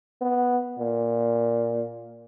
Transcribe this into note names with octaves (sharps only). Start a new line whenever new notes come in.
B3
A#2